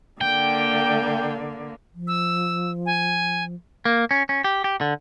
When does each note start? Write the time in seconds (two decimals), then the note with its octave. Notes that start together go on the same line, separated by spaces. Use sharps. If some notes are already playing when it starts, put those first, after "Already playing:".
0.21 D3 A#3 G5
1.94 F3
2.08 E6
2.86 G#5
3.85 A#3
4.11 C#4
4.29 C#4
4.44 G4
4.64 G4
4.81 D3